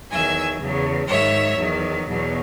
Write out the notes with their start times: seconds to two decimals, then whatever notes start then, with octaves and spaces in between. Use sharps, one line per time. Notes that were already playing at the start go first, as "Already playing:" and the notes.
0.11 E2 D#3 F#3 E5 G#5
0.61 E2 C#3 F#3
1.09 G#2 D#3 F#3 C#5 E5
1.58 E2 D#3 F#3
2.07 E2 B2 F#3